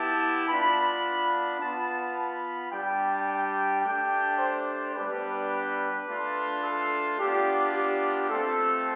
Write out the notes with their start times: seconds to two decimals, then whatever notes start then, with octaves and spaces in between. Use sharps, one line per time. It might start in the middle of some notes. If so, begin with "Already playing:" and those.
Already playing: B3 E4 G4 A5
0.47 B3 D4 F4 B5
1.59 B3 F4 A5
2.15 B5
2.71 G3 D4 G4 G5
3.27 G5
3.82 A3 D4 G4 G5
4.38 C5
4.94 G3 B3 D4 G4 B4
6.06 A3 D4 F4
6.61 A4
7.18 B3 D4 F4 G4
7.73 G4
8.29 A3 C4 F4 A4